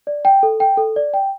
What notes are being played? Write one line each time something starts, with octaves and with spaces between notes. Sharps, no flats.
D5
G5
A4
G5
A4
D5
G5